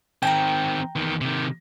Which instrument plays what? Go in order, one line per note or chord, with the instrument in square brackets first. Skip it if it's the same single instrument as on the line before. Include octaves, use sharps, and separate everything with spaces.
[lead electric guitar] D#3 C4 [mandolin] G5 G#5 A#5
[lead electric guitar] E2 D#3
C3 D#3